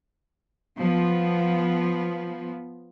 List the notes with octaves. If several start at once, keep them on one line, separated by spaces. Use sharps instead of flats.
F3 B3